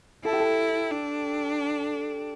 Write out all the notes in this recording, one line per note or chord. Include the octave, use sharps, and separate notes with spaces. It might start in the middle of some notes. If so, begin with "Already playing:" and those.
E4 A4
G4
A4
D4